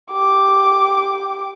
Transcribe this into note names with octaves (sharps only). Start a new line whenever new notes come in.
G4 D6